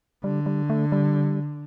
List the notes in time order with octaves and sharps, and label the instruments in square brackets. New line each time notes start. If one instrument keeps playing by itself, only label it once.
[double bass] D3 [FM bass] G3
[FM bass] G3
A3
G3